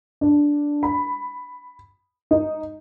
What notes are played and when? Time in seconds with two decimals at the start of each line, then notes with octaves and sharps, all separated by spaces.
0.21 D4
0.83 B5
2.31 D#4